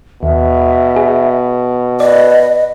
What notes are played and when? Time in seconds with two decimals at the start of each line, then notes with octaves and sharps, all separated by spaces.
0.23 D#2 B2 E5
0.96 G#4
2.00 B4 D5 D#5